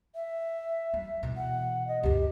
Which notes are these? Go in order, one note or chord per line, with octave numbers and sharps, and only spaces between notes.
E5
G3
B2 E3
F#5
D#5
C#2 F#2 G4